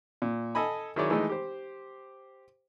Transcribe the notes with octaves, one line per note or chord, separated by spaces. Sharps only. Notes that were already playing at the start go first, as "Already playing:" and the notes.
A#2
A4 D#5 G#5 B5
D#3 F#3 E4 G#4 C#5 D5
E3 G#3 A3 D#4
G4 C5